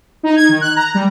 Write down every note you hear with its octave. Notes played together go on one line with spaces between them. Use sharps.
D#4
G#6
D#3
F#6
A#5
G3